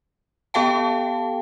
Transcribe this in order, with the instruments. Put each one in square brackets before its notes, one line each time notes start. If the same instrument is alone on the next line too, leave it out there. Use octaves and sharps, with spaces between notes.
[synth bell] B3 G4 A4 F5 G5 A5